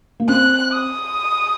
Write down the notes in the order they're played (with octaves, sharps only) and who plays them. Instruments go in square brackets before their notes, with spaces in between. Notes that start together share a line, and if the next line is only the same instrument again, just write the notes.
[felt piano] A#3
[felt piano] C4 [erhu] F#6
[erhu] D#6